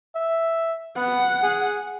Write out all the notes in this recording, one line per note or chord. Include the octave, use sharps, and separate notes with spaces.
E5
B3 F#5
G#4